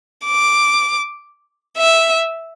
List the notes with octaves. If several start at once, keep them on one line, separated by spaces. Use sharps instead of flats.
D6
E5